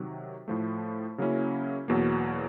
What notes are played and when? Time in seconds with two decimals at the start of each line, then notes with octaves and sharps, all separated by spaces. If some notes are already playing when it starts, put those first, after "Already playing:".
Already playing: C3 D#3 F#3
0.48 A2 F3 A3
1.18 C#3 F#3 A#3 C#4 E4
1.88 E2 B2 F#3 A#3